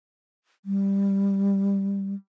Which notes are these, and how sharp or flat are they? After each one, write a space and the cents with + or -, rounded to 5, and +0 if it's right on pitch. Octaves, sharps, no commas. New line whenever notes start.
G3 +10